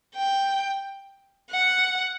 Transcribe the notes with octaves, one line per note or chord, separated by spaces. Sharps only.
G5
F#5